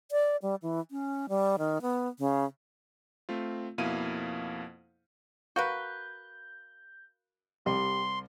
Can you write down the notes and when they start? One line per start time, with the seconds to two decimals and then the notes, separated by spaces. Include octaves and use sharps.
0.11 D5
0.42 G3
0.62 E3
0.91 C#4
1.29 G3
1.58 D#3
1.82 B3
2.19 C#3
3.29 A3 C4 F4
3.78 F2 B2 A#3 E4 F5 D#7
5.56 F#4 A#4 B4 F5 G6
7.66 C2 G4 C6